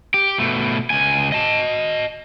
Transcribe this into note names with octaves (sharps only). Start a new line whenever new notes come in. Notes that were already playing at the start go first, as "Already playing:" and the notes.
G4
B2 A3
C#2 G#5
D#5 A5